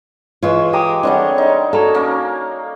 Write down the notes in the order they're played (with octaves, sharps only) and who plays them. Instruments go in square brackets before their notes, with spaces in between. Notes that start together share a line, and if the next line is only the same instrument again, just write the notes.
[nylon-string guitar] E3 F4 [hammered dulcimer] G#3 C#5
[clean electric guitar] G4 [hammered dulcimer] A#5 [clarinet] D#6
[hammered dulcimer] D3 G3 G#3 [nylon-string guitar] C4 D4 [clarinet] C#5
[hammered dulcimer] D#4 A#4
[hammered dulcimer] A#3 [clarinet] F#4 [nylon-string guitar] A4 [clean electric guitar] C#5 A#5
[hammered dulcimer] A#3 C#4